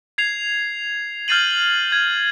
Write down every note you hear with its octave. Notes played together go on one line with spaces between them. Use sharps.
G#6 C7 F7
F6 G6 A6 C7 D#7 F#7
G#6